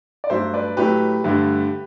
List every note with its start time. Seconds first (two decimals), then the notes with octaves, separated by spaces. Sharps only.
0.24 D5
0.30 G2 F#3 A3 C5 E5
0.54 B4 D5
0.77 A2 F#3 A3 G4 B4
1.24 G2 D3 A3